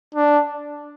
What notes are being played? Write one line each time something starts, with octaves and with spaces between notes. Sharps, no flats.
D4